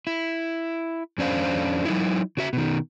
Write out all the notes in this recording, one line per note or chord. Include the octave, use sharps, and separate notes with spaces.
E4
F2 C#4 D4 C5 F5
F#3 D#4 E4
C#3 F#4 E5
B2 D#3